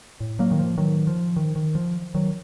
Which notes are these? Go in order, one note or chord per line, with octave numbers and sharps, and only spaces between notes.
A2
F#3 A#3
D#3
F3
D#3 F#3
F3
D#3
D#3
F3
D#3 F#3